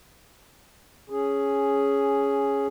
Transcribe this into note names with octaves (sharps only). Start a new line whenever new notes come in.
C#4 G#4